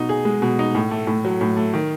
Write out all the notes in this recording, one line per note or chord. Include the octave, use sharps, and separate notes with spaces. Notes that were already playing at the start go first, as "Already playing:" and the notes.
Already playing: B2 D#4
G#4
G#3
B2
D#4
A2
A3
A2
F#3
A2
A3
D#3